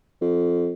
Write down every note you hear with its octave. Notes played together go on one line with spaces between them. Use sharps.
F2